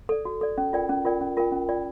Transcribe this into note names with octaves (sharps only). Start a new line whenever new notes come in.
A4 D5
F#4
A4 D5
C#4
F4 A#4 D5 G5
C#4
F4 A#4 D5 G5
C#4
F4 A#4 D5 G5
C#4
F4 A#4 D5 G5